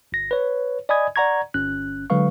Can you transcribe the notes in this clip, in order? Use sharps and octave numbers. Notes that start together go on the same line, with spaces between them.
G1 A#6
B4 C#5
D5 D#5 G#5 B5 D#6 G#6
D5 F#5 A#5 C#6 G#6
G1 C#4 F#6
D3 F#3 G#3 B4 F5 C#6